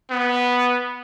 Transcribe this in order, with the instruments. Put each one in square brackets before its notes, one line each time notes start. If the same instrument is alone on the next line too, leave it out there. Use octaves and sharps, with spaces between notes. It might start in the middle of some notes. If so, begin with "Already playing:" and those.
[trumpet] B3